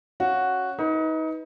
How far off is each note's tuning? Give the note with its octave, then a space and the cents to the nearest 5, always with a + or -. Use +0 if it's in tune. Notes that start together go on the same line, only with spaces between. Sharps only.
C#4 +0 F#4 +0 F5 +0
D#4 +30 B4 +0